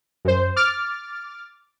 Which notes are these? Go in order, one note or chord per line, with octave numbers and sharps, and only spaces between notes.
F#2 C5
D6 F6 A6